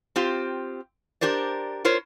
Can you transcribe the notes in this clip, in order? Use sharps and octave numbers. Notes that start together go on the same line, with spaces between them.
C4 F4 G4
D4 G4 A#4 C5 D5
F4 A#4 C5 C#5